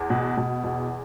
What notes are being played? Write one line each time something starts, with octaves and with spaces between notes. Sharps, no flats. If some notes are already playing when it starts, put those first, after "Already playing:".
Already playing: E2
B2
B2
E2